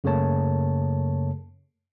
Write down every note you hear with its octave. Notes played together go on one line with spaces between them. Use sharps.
F#2 C#3 A3 A#3 C#5 A5